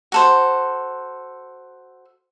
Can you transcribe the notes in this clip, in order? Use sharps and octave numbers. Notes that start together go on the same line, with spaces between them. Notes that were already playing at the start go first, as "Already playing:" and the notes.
F#4 A4 C5